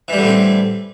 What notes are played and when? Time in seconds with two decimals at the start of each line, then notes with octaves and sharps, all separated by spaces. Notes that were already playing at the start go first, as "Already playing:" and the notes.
0.08 E3
0.13 G3
0.17 D3
0.22 A2
0.26 C4